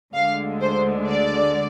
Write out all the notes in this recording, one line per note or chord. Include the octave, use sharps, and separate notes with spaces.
D2 D3 G#3 F5
C5
D5